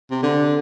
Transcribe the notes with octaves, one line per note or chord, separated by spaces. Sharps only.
C3
D3